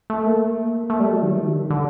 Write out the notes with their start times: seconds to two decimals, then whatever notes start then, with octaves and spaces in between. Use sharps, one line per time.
0.10 A3
0.26 A#3
0.90 A3
1.00 G3
1.11 F#3
1.22 D#3
1.33 G3
1.43 D#3
1.54 D3
1.70 D3